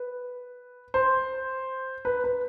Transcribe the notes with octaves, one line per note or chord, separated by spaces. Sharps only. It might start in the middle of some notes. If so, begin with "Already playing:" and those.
Already playing: B4
C5
B4
B4